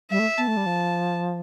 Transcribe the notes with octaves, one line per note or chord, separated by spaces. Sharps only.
G3 E5
A3
B3 A5
A3
G3
F3